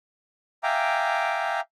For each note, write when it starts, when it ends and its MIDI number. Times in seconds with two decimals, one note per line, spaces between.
0.63 1.60 76
0.63 1.60 77
0.63 1.60 79
0.63 1.60 80
0.63 1.60 82
0.63 1.60 86